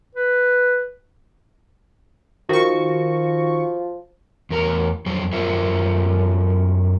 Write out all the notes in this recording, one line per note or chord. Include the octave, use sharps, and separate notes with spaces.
B4
D#3 F3 F#4 C#6
E2 A#4 A#5
F2 F#3 G#4 C5
F#2 F#3 F4 A#4 C5 E5